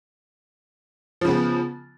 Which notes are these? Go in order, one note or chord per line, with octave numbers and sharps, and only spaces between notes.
C#3 F3 B3